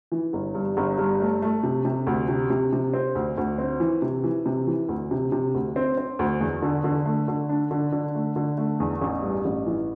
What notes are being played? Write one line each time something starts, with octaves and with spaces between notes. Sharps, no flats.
E3
G1
G2
G1
G2
A3
A3
C3
C3
D2
C3
C3
C3
C4
D2
D2
C4
E3
C3
E3
C3
E3
D2
C3
C3
D2
C4
C4
D2
E2
D3
D3
A3
D3
D4
D3
D3
A3
D3
A3
E2
A1
G2
A1
E3